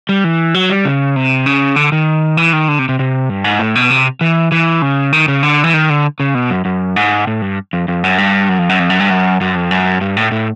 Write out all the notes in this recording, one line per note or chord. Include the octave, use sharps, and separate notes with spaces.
G3
E3
F#3
G3
C#3
C3
C#3
D3
D#3
E3
D#3
D3
C3
C3
C3
G2
G#2
A2
B2
C3
E3
E3
C#3
D#3
C#3
D3
E3
D#3
D3
C#3
B2
F#2
F#2
G#2
A2
G2
F2
F2
F#2
G2
F#2
F2
F#2
F2
F#2
G2
F#2
F#2
F2
F#2
G2
A2
A2